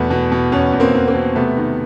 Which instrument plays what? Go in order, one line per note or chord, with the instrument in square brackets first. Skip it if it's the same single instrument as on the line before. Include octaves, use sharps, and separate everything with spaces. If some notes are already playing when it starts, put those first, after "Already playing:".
Already playing: [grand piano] E2 B2 A3 B3
B2
B2
E2 B3 C#4
E2
A#3 C4
E2
A#3 C4
B2
C3 A3 B3
D#3